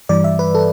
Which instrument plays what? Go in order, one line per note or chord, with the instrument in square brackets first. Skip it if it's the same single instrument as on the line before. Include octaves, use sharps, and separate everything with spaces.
[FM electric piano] G2 E3 G3 D5
E5
B4
A4